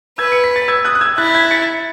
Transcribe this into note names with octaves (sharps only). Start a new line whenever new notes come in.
B4 E6 G#6
C#7
B6
A6
E6 G#6
D#6 F#6
F#6
E6 G#6
E4 F#6 A6
G#6 B6
A6 C#7